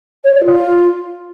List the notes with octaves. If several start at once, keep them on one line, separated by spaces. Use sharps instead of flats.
C#5
D5
F4